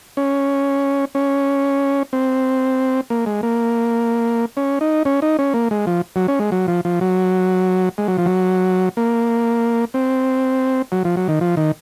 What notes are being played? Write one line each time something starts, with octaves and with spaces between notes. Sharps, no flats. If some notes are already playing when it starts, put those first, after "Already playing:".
C#4
C#4
C4
A#3
G#3
A#3
C#4
D#4
C#4
D#4
C#4
A#3
G#3
F3
F#3
C#4
G#3
F#3
F3
F3
F#3
G#3
F#3
F3
F#3
A#3
C4
F#3
F3
F#3
D#3
F3
D#3